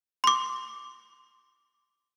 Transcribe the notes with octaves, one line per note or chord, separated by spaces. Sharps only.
C6 D6